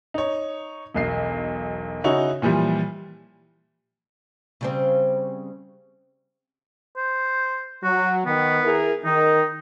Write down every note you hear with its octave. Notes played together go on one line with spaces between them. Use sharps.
D#4 C#5
E1 B1 C7
C#3 D#4 E4 F#4 C#5
A#2 E3 F3 G3
C#3 G3 C4
C5
F#3 F#4
D#3 B3
E4 G#4 A#4
D#3 D#4